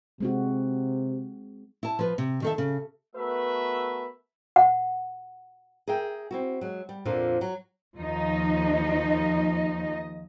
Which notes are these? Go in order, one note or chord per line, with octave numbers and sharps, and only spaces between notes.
C3 G#3 C4 F#4
E4 A5
F3 B4
C3
D#3 A4 E5
C#3
A3 B3 F#4 A#4 B4 E5
F#5
G#4 A#4 E5 G5
C4 E4 F#4
F#3 G#3
G3
F2 A#2 D3 F3 F4
F#3
D#2 F3 D#4 D#5